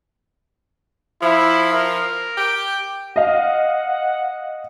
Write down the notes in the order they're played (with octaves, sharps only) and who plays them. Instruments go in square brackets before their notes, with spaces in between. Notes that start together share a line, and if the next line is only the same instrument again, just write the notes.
[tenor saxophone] F3 [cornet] E4
[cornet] A#4
[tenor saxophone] G4
[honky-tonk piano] D#5 F5 [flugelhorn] F#5